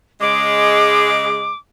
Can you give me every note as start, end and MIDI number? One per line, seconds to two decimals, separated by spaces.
0.21 1.49 49
0.21 1.49 56
0.21 1.55 86